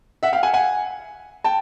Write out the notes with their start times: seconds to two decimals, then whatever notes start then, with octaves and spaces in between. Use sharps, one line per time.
0.23 E5 F#5
0.32 F5 G5
0.43 F#5 G#5
0.54 F#5 G#5
1.44 G5 A5